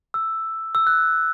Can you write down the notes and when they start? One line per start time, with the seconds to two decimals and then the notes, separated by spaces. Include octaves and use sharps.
0.14 E6
0.75 E6
0.87 F#6